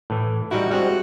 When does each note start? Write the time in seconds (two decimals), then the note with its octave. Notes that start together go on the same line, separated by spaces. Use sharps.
0.10 A2 E3
0.51 G3 D#4 E4 F#4
0.71 G3 G#3 C4 F#4